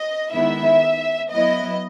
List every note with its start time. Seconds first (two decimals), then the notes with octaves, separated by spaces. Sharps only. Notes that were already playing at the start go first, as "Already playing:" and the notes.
Already playing: D#5
0.33 D#3 G#3 B3 E4 E5
1.31 F#3 B3 E4 D#5